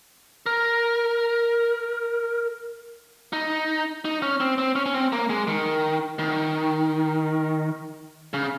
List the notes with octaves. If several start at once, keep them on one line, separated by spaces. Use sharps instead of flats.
A#4
D#4
D#4
C#4
C4
C4
C#4
C#4
C4
A#3
G#3
D#3
D#3
C#3